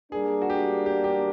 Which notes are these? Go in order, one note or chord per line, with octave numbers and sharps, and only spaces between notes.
G3 A#3 D4 G#4
F#4
G4
G4
G4